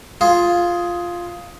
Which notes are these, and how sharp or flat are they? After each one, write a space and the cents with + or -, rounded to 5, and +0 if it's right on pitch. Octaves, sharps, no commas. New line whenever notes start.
F4 +0 G#4 +10